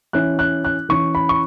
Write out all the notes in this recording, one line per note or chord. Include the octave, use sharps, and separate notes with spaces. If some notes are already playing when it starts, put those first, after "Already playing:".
E3 C#4 E4 F#6
F#6
F#6
E3 C#4 E4 C#6
B5
C#6